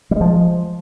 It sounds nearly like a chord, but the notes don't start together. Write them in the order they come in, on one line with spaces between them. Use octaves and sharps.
G3 G#3 F3